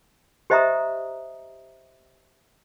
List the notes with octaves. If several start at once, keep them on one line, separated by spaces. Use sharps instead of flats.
G4 C5 D#5 E5 A#5 D#6